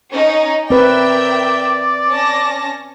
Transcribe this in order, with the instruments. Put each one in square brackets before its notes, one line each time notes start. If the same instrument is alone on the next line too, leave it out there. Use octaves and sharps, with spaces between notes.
[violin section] C#4 D#4
[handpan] C4 B4 [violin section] A#4 E5 G5 [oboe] D5
[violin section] C#4 A5 A#6